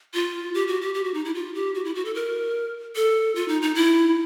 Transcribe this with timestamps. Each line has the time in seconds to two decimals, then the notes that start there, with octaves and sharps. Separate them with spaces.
0.14 F4
0.54 G4
0.68 F#4
0.81 G4
0.94 G4
1.04 F#4
1.14 D#4
1.25 E4
1.35 F4
1.54 G4
1.74 F#4
1.85 E4
1.95 F#4
2.05 A4
2.15 A#4
2.96 A4
3.35 F4
3.48 D#4
3.62 D#4
3.75 E4